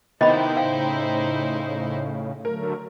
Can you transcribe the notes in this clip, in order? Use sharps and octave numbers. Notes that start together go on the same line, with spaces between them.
C3 D#3 B3 D#4 E4 C5 D#5 B5
A2 C#3 F5 G5
D3 F#3 A3 A#4